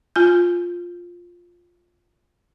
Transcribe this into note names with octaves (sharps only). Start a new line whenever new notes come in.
F4 G#5 G6